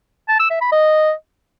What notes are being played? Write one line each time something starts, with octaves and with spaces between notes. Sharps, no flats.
A5
E6
E5
B5
D#5